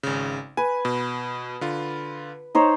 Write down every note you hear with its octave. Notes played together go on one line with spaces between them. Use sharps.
G#1 C#3
B4 G#5
B2
D3 F4
D#4 C5 C#5